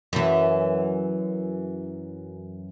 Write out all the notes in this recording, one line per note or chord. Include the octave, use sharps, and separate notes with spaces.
F#2 E3